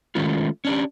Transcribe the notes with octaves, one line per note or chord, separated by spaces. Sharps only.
D#3 G#3 A3 C#4 F4
C#4 D4 G4